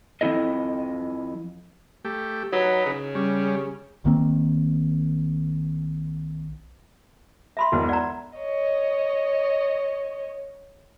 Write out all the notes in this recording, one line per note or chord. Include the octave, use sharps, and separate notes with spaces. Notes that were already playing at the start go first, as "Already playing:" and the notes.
F2 G#3 E4 A4 D#5
A3 G4
F#3 D#4 B4
C#3
G3 C#4
B1 D#3 A#3 C4
E5 B5 C6
E1 B1 E2
D5 F#5 A#5
C#5 D#5